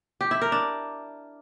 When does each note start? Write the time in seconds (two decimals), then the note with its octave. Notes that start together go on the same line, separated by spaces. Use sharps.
0.21 G4
0.31 E4
0.42 A#4
0.52 D4